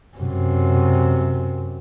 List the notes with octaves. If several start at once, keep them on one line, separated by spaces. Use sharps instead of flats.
F#2 C3